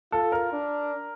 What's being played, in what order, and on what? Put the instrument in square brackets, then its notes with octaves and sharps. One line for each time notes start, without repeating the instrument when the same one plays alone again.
[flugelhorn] F4 [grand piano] A4
[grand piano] A#4
[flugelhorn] D4